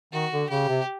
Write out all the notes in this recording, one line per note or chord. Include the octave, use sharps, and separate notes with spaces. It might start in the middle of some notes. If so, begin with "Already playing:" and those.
D#3 F#4
D3
C#3 G4
C3